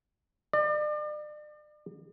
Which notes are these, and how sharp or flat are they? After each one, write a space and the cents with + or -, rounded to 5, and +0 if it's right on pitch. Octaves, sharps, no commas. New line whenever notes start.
D5 +40